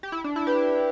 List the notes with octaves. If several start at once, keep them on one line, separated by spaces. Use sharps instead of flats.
G4
E4
D4
E4
G4 B4